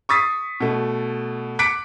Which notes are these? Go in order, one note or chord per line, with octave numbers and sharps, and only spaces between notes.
C#6 D#6 A6 B6 C7
B2 A3
D6 F#6 B6 C#7 D7